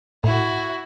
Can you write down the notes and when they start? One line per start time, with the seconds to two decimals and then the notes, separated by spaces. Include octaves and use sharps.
0.24 A2 E4 F#4